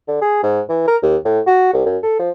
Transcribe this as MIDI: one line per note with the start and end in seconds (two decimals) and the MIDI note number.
0.08 0.18 50
0.21 0.40 68
0.43 0.60 44
0.69 0.84 52
0.88 0.97 70
1.03 1.16 39
1.25 1.40 45
1.47 1.71 66
1.73 1.85 36
1.86 1.98 42
2.03 2.17 69
2.19 2.31 53